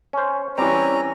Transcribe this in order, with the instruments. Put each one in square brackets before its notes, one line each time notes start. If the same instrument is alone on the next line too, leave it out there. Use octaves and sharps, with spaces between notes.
[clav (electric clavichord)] C#4 C5
[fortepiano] E3 C4 [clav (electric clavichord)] G3 [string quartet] C#4 [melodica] A#5